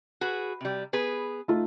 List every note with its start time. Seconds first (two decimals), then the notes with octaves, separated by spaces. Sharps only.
0.21 F#4 G#4 B4
0.61 C3 G3
0.93 B3 G#4 B4
1.48 A3 D#4 F4